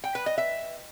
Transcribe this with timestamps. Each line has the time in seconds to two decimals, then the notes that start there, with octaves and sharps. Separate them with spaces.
0.04 G5
0.15 B4
0.26 D#5
0.38 E5